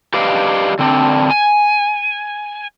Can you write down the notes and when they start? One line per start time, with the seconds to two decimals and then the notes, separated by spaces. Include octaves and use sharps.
0.14 G4 B4 D5 D#5 F5
0.79 D3 C4 D4
1.31 G#5